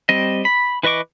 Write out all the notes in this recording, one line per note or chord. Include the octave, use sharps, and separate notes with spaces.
G3 C4 D#5
B5
E3 B4 D#5 C#6 D6